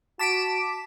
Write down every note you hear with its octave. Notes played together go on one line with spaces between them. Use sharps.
F#4 A5 D6 B6 D7 E7